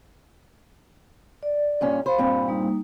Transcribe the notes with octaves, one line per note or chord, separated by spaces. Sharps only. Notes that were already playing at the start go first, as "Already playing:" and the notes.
D5
G2 A#2 C#4
C5 F5 B5
G2 A#2 C4
G3 A#3 D#4